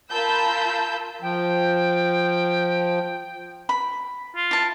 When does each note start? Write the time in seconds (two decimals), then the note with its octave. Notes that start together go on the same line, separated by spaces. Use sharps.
0.11 F4 A#4 A5 B5 E6 G6
1.22 F3 G5
3.69 B5
4.35 F4
4.51 E4 A5